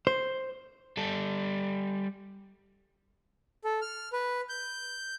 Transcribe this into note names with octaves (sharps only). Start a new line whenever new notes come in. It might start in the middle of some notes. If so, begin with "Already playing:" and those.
C5
G3 A4
A4
F6
B4
G6